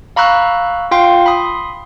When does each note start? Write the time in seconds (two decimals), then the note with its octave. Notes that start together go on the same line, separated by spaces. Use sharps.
0.16 F5 A#5 B5 C#6 E6 F#6
0.91 F4 F5 G5 C6 C7
1.26 B5 C6 D#6